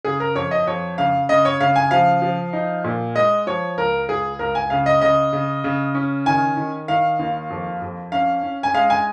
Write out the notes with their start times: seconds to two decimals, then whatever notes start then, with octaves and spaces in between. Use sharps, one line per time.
0.05 C#3 G#4
0.20 A#4
0.35 F2 C#5
0.51 D#5
0.67 F2 C#5
0.98 C#3 F5
1.29 C#3 D#5
1.45 C#5
1.60 C#3 F5
1.76 G#5
1.91 F3 F5
2.22 F3
2.53 D#4
2.84 A#2
3.15 G#3 D#5
3.47 F3 C#5
3.77 C#2 A#4
4.08 C#2 G#4
4.39 C#2 A#4
4.55 G#5
4.70 C#3 F5
4.86 D#5
5.01 C#3 D#5
5.33 C#3
5.64 C#3
5.94 C#4
6.26 D#3 G#5
6.57 D#3
6.88 D#3 F5
7.19 D#2
7.50 F2
7.82 F2
8.12 C#4 F5
8.43 C#4
8.63 G#5
8.74 G#3 F5
8.90 G#5